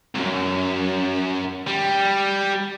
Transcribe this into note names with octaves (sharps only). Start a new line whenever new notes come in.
C2 F#2
G3